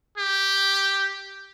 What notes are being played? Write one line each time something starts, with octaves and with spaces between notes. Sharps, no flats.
G4